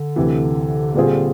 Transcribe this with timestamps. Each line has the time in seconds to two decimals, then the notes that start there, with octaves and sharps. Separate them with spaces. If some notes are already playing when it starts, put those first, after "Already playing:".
Already playing: D3
0.16 D2 C3 E3
0.94 A#2 G3 C4 F4 G#4